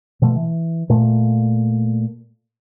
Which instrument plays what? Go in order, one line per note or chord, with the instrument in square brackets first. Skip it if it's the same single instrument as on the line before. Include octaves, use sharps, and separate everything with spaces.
[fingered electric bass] B2 F3 A3
E3
A#2 A3